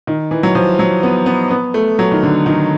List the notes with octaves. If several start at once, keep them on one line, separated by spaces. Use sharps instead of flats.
D#3
E3
F#3
F3
F#3
B3
B3
B3
A3
F#3
D#3
D3
D#3